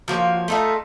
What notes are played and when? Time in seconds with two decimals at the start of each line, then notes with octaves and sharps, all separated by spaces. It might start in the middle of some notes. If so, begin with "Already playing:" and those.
0.08 F3 A#3 F#4 C#5
0.48 A3 D#4 F4 A5